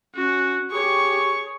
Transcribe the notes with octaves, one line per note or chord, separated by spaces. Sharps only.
C#4 F#4
G4 G#4 C#5 C#6